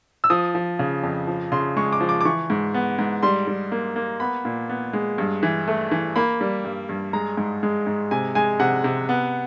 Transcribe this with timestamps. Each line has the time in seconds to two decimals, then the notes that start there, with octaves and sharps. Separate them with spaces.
0.24 E6
0.30 F3 D#6
0.55 F3
0.79 C#3
1.03 F2
1.27 F3
1.52 C#3 C6
1.77 G#3 C#6
1.93 D6
2.01 F3
2.09 D6
2.21 D6
2.25 E3 C#6
2.50 G#2
2.74 B3
2.99 G#2
3.23 G3 C6
3.47 G3
3.72 A#3
3.96 A#3
4.20 B3 B5
4.45 A#2
4.69 B3
4.93 G#3
5.18 G2
5.43 E3
5.68 A3
5.91 E3
6.16 A#3 B5
6.41 G3
6.65 G2
6.89 G2
7.13 G#3 A#5
7.37 G#2
7.63 G#3
7.87 G#2
8.11 C3 G#5
8.35 G#3 G#5
8.60 C3 F#5
8.84 C3
9.09 B3